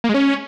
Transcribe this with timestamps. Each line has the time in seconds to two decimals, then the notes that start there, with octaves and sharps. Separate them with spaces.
0.04 A#3
0.09 G#3
0.14 C#4